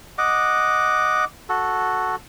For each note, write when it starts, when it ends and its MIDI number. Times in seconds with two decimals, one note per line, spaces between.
0.18 1.25 75
0.18 1.25 78
0.18 1.25 86
1.49 2.16 66
1.49 2.16 69